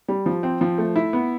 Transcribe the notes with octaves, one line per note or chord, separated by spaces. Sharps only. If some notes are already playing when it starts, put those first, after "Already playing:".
G3
F3
C4
F3
A3
E4
B3